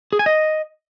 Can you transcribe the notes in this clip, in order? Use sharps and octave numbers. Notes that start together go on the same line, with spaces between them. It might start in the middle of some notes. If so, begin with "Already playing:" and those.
G#4
G#5
D#5